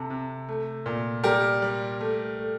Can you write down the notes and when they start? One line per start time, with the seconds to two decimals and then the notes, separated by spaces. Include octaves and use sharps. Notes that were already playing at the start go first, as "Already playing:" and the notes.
Already playing: C3 A4
0.10 C3
0.49 A3
0.86 A#2
1.24 G3 G4 A#4
1.62 G3
2.01 A3
2.39 A3